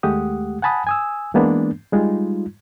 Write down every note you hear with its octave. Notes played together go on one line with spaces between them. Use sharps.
D#2 G#3 A3 G4 F#5 D#6
F#5 G#5 A5 B5 D#6
G#5 D#6 E6
E3 G#3 A#3 B3 D4
G3 G#3 D#4 F4